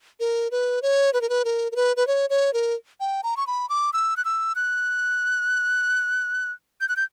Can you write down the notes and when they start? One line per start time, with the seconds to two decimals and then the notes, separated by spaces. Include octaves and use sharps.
0.20 A#4
0.51 B4
0.82 C#5
1.13 B4
1.21 A#4
1.29 B4
1.45 A#4
1.72 A#4
1.76 B4
1.97 B4
2.07 C#5
2.30 C#5
2.53 A#4
3.00 G5
3.24 A#5
3.37 C#6
3.47 B5
3.70 D6
3.93 E6
4.17 F#6
4.25 E6
4.56 F#6
6.81 G6
6.89 F#6
6.96 G6